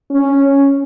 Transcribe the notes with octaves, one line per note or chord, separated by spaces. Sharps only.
C#4